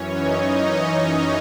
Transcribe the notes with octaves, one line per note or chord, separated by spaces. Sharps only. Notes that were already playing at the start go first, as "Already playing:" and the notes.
Already playing: F#2 E3 C#4 C#5
D#4 D#5